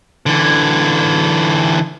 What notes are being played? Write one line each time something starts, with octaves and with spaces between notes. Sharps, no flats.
D3 E3